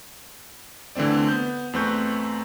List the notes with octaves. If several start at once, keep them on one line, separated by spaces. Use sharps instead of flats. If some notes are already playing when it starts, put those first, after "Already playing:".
D3 E3 A3 C4 D5
B3 G6
E2 A3 C4 B4 C#6 G6